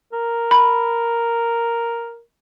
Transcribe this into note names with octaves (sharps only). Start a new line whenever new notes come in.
A#4
B5